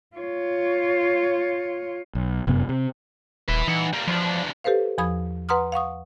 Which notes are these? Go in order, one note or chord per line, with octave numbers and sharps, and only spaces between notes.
F4 C#5
B1
F1 F#2 C3 B3
C3
D#1 B4 E5
E3 D#4 F#5
G3 A#3
E2 F3 D4
G4 A4 B4 C5 F5
E2 F3 B5 D#6 G#6
B4 F#5 A#5 C6 D#6 F6
F5 F#5 C#6 D#6